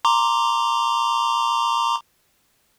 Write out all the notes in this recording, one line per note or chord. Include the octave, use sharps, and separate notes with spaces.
A#5 C6 D6